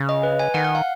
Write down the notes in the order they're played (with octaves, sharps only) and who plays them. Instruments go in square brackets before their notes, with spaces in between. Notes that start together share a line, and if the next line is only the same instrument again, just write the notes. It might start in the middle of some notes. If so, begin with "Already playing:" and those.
Already playing: [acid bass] C#3
[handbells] D#5
B4
G#5
[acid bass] D#3 [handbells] F#5
[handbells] F#5
F5